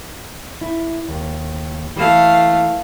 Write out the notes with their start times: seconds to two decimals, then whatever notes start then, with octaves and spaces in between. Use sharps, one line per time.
0.61 E4
1.08 D#2
1.96 E3 A3 F5